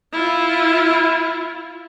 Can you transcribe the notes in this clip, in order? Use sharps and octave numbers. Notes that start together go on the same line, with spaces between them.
E4 F4